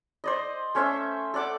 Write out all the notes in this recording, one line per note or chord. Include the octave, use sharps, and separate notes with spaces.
C5 D5 D#5
A3 C#4 C5 E5
A4 D5 F#5 D6